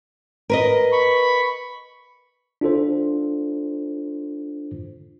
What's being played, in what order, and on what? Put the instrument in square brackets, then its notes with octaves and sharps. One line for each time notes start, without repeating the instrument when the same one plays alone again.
[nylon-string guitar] A#4 B4 D#5
[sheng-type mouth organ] B5 C#6
[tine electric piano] D4 F4 A4 C5